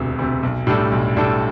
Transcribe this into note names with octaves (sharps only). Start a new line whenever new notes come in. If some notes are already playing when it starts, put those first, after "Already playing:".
Already playing: E1 D2 C3
D2 C3
B1
A2 G3 D4 A4
B1
A2 G3 D4 A4